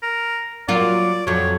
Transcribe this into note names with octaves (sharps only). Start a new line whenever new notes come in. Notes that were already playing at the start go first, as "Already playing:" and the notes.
A#4
F#3 A#3 F4 D5
F2 F#3 C#5